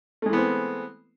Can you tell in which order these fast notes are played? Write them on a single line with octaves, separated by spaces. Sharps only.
A3 G#3 E3 B3 C4